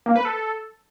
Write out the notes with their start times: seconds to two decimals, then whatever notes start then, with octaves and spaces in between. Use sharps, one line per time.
0.06 A#3
0.16 B4
0.25 A4